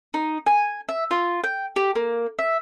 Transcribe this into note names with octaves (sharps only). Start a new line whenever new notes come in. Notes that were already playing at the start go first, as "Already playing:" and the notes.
D#4
G#5
E5
F4
G5
G4
A#3
E5